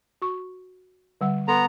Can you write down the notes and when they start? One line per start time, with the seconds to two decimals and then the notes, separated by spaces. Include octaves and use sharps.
0.22 F#4 C#6
1.21 D3 G3 F#5
1.48 B3 A4 A#5 C6